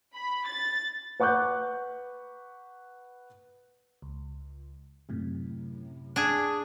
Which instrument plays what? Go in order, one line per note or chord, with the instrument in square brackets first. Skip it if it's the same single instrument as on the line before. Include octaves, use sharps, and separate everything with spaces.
[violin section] B5
A6
[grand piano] B4 F#5 C#6 D6 F#6 G6
[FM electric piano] C#2
F#2 A2 C3
[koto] D4 G#4